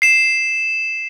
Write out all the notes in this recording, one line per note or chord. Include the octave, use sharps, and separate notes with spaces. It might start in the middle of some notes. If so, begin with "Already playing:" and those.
C7 E7